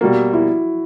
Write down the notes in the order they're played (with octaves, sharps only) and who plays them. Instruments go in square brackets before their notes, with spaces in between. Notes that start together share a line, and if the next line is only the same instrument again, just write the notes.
[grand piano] B2 G3 A#3 [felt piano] F#4
[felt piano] E4